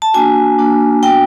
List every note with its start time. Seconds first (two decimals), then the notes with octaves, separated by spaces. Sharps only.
0.02 A5
0.14 A#3 D4 F#4 G#5
0.58 A#3 D4 F#4
1.03 B3 D4 F#4 G5